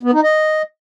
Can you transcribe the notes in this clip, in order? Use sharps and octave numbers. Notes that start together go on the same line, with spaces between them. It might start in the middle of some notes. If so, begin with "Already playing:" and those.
B3
D#4
D#5